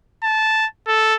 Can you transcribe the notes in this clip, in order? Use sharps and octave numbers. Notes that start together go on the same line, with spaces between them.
A5
A4